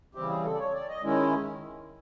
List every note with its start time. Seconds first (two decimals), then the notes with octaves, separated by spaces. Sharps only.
0.15 C#3 E3 G3 C4 G4
0.29 G#4
0.44 A4
0.54 D5
0.60 C#5
0.74 D5
0.89 D#5
1.03 D#3 G#3 C#4 E4